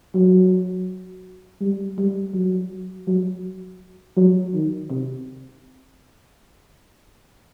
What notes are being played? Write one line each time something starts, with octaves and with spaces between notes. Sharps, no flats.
F#3
G3
G3
F#3
F#3
F#3
D#3
C3